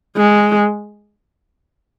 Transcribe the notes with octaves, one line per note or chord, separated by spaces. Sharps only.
G#3